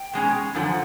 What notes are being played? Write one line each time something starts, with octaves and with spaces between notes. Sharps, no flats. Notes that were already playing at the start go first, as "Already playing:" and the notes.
Already playing: G5
B2 G#3 C#4
F#2 D3 F3 F#5 G#5